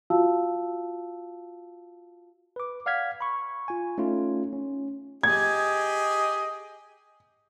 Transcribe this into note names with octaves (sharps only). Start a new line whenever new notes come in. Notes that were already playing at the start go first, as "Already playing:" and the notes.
F4 F#4 F5 A5 E6
B4 D6
D5 F5 F#5 F6 G#6 B6
B5 C#6
F4 G#5
A3 C#4 D#4 F4
C#4
G4 G#4 D#5 G#6